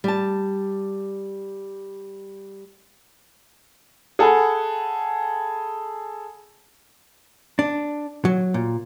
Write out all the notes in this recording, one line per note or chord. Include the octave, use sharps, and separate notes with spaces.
G3 A5
G#4 A4 F#5 G#5 B5
D4
F#3
A#2